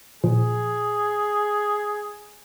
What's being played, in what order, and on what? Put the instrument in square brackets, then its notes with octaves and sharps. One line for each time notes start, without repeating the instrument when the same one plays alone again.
[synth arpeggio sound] A#2 F3 [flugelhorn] G#4